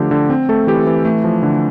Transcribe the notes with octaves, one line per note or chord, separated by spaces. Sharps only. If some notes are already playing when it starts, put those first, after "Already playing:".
Already playing: D3 F3 A3 G4
D3
C4
A3 A4
E3 G4
E3
A3
F3
D3